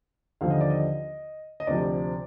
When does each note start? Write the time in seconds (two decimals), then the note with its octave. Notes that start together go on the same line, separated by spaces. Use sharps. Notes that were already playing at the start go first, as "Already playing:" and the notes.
0.41 D#2 D3 F3 F5
0.50 D#5
0.61 D5
0.70 D#5
1.60 D#5
1.67 D2 C3 F3 D5